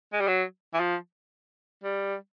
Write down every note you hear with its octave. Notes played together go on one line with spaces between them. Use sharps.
G#3
G3
F#3
E3
F3
G3